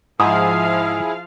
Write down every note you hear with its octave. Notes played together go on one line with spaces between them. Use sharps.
G#2 F3 E4 G#4 F5 D#6